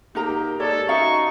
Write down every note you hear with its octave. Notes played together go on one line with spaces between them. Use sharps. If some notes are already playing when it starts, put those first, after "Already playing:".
B2 A#3 D#4 G4 A#4 A#5
G#2 G#3 A#3 G4 A4 C#5 D5
C#4 D#4 F#4 E5 F5 C#6